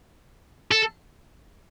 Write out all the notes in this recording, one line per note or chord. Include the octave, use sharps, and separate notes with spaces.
A4